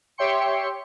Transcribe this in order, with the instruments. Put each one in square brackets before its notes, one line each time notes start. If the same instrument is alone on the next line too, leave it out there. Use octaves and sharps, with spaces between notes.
[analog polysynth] G4 C#5 E5 G5 C6 C#7